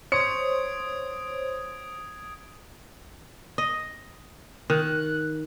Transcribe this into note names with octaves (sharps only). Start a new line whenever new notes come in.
C5 C#5 D#6 G#6 C#7 D7
D#5
D#3 F#6